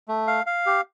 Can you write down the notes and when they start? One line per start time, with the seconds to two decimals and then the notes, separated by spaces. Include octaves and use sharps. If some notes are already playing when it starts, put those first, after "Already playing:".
0.08 A3
0.27 F5
0.46 F5
0.66 G4